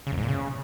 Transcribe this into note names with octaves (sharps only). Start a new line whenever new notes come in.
C#3
E2
G#2
A#2
C#3